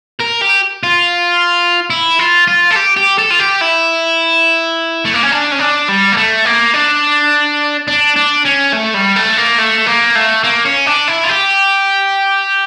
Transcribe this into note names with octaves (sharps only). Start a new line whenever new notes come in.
A#4
G4
F4
E4
F4
F4
A4
G4
G4
A4
F4
G4
E4
A3
A#3
C#4
D4
C#4
D4
G3
A#3
A3
A#3
D4
D4
D4
C#4
A3
G3
A3
A#3
A3
A#3
A3
A#3
C#4
D4
E4
F4
G4